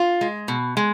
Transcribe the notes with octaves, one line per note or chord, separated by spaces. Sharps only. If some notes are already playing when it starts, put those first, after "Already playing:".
Already playing: F4
G#3
B2
G#3